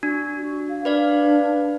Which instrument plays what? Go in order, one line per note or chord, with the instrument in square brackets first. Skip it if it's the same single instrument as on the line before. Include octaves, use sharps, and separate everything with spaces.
[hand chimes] D4 [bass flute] F#4
[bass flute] F#4
F5
[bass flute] D4 [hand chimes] B4 D5 F5